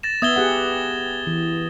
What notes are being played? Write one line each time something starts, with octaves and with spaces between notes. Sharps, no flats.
A6 A#6 E7
B3 E5 D#6 G#6 G7
G4 G#4 F#5
E3